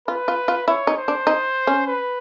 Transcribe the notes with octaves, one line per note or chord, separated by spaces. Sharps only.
F4 B4
F4
F4
E4 C#5
D#4
C5
D4
D#4
C#4
B4